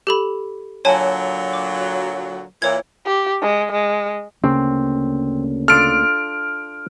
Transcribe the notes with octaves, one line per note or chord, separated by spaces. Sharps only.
G4 A4 B5
A#2 D3 F#3 C#5 G#5 A5
D6
A#2 E3 C#5 G#6
G4
G#3
G#3
D2 C#3 A#3 C4 C#4
D4 F4 A4 F6 D7